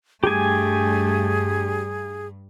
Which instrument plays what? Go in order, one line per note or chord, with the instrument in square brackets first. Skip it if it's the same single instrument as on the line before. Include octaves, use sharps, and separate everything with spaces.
[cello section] G2 [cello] A3 [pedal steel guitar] G4 G#5 [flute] G#4